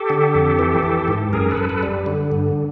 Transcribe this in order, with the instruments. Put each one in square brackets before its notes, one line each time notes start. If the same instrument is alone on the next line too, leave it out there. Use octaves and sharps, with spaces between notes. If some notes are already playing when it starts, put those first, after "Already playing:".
Already playing: [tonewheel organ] G4 A4
D3
F2
E3
E3
G#2
F#2 G#4 A#4
A4 B4
F#2
A4 B4
G3
D3
G2